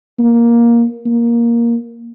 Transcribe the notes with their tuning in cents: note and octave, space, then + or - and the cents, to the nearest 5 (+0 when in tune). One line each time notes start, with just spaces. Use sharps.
A#3 +10
A#3 +10